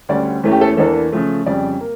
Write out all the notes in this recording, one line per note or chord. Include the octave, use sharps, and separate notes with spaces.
D2 D3 G3 C#4 D5
E2 E3 A3 C#4
G4
A4
E2 E3 A#3 D4 A4
C#3 F3 A3
F2 C#3 G3 D5
A#3